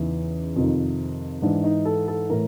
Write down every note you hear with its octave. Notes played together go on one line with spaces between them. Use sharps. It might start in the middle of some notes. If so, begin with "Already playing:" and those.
Already playing: E2 C#3 E3 D#4
F2 C3 D#3
G#2 E3 D4
D#4
A4
A4
A2 E3 A#4